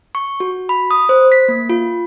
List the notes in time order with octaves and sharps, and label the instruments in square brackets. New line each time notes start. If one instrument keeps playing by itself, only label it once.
[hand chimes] C#6
F#4
B5
D#6
C5
B6
A#3
F4